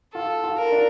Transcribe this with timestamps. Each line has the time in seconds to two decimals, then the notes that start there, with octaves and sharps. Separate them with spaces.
0.15 F4 A4
0.44 F4
0.58 A#4
0.72 D4